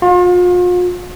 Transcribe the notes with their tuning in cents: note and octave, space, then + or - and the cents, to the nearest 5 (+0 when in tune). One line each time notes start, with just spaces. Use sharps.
F4 +40